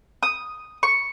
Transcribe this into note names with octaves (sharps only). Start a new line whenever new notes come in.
D#6
C#6